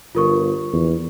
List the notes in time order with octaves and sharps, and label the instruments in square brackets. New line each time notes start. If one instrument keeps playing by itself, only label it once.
[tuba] G1 [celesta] F4 A#4 C#6
[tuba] E2